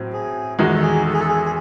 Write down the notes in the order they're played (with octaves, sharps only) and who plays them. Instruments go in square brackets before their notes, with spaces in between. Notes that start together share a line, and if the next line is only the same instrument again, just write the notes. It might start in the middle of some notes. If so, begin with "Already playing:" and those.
Already playing: [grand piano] A2 F#3 C4
[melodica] G#4
[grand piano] E2 D#3 G#3 D#4 F#4
[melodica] A4
G#4
A4
G#4
A4
G#4
G#4